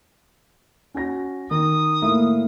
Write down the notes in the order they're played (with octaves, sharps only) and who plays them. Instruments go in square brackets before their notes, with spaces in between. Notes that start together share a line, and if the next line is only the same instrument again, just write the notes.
[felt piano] C#4 F#4 A#6
[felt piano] D#3 [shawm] D#6
[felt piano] A2 A#3 E5